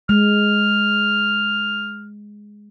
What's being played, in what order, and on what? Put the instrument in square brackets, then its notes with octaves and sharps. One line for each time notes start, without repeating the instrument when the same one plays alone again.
[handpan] G#3 [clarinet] F6